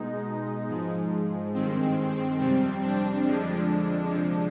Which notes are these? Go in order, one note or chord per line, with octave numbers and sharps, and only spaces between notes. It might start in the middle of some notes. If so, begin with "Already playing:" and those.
Already playing: B2 G#3 D#4
G#2 F3 G#3
G2 D#3 G#3 C4
C4
C4
F2 C3 G3 C4
D4
F2 D3 F3 G#3
C3 F3 G#3